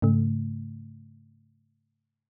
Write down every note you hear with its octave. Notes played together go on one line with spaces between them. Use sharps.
G#2 C#3 A3